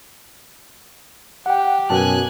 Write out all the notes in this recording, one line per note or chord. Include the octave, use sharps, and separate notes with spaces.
G4 F#5 G5
F#2 B2 G#5 A5 F#6